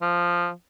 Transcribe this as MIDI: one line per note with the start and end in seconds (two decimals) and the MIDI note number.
0.02 0.51 53